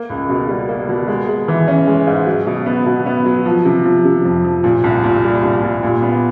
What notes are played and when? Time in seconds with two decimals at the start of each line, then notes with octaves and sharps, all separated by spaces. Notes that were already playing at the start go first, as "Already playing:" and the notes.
Already playing: A#3
0.10 C#2
0.29 B2
0.48 G3
0.68 A#3
0.89 B2
1.08 G#3
1.28 G#3
1.48 E3
1.68 C#4
1.87 G#3
2.07 G#2
2.27 F#3
2.47 B2
2.66 B3
2.86 B2
3.06 B3
3.26 F#3
3.45 F3
3.65 C3
3.85 F3
4.05 C3
4.25 F2
4.44 F3
4.64 A#2
4.84 C2
5.04 A#2
5.24 G3
5.43 C2
5.62 A#2
5.83 A#2
6.02 B3